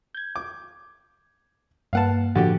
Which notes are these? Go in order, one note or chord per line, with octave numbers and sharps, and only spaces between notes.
G6 G#6
D6
G2 A#3 B4 F5 F#5 A5
A2 D3 F3 F#4 G4 A6